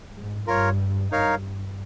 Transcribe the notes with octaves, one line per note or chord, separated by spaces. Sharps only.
G#2
G2 F4 A#4 C#5
G2 D#4 A#4 C#5 F5